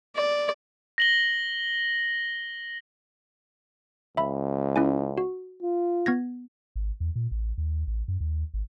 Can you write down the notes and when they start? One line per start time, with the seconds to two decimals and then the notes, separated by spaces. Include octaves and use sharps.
0.15 D5
0.98 A#6 F#7 G7
4.17 C#2 E5 B5
4.76 C#4 E4 G#5
5.18 F#4
5.63 F4
6.06 B3 G#6 A#6
6.76 G#1
7.00 E2
7.16 A#2
7.31 A1
7.58 D#2
7.87 A1
8.08 F#2
8.21 D#2
8.54 G#1